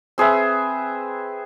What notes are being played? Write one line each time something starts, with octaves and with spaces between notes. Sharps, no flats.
C4 G#4 B4 E5